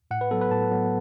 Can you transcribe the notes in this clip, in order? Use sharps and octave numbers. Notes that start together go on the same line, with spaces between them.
A2 F#5
B4
F#3 B3 A4
B4
A2 A5
F#3 B3